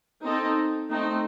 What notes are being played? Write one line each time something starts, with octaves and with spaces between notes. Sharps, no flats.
C4 D#4 A4
A3 C4 D#4